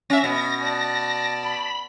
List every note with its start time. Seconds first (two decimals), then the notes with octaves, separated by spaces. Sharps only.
0.10 C#4 E5 A#6
0.24 B2
0.60 D5 A5
1.43 B5